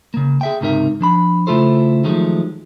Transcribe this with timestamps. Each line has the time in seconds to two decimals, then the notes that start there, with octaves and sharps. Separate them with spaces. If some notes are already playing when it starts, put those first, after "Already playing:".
0.14 C#3 A#3
0.41 G#4 E5 G5
0.61 C#2 G#2 C3 D#4 A#4 E5
1.01 F3 D4 B5
1.47 C#3 A3 E4 F4 A4 C5
2.04 D#3 F3 F#3 G#3 A3